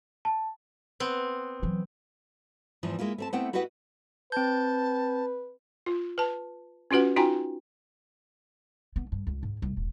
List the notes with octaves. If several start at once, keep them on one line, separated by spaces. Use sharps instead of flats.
A5
B3 C4
E3 F#3
E2 G#2 E3 F3
G#3 A#3 E4 F4
A3 C4 A5
A3 B3 C4 E4 F#5 G5
E4 F#4 G4 B4 D#5 F#5
C4 B4 A5 G6
F4
B4 A5
C#4 F4 F#4 B4 F#5
D#4 F4 F#4 G5 G#5 A#5
B3
G2
C#2
G#2
C2
D#1